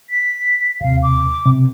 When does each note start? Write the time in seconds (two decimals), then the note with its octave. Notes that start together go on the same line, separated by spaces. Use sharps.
0.10 B6
0.81 D#2 C3 F5
1.03 D6
1.46 C3